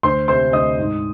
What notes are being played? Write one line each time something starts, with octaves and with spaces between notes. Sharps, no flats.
D2 C5 C6
C3 C5 C6
D2 D#5 D#6
G#2